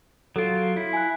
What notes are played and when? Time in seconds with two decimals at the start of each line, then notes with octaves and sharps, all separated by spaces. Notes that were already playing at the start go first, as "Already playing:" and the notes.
0.36 F#3 F4 A4 D7
0.77 E4
0.93 G#5 F#6